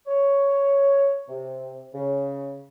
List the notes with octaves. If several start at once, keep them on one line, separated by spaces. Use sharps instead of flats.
C#5
C3
C#3